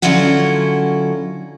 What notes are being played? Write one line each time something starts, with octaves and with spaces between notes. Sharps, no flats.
D3 F#3 C#4 E4 F4 F#5